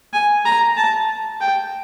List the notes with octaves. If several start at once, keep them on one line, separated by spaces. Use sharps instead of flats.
G#5
A#5
A5
G5